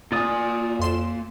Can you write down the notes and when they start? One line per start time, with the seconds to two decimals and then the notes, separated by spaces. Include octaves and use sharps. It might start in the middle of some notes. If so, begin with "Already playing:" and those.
0.12 A#3 F4 D5 G#5 D#6
0.79 F2 C6 E7